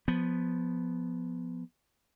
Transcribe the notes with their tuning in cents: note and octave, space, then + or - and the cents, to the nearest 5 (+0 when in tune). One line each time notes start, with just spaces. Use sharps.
F3 +10 B3 +0